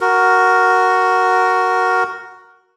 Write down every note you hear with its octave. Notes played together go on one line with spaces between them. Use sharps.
F#4 A#4